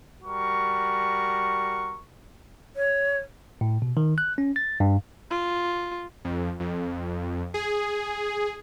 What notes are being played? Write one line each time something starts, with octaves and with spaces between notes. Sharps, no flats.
G3 F#4 A#4 C#6
C#5
A2
B2
D#3
F#6
C#4
A6
G2
F4
F2
F2
G#4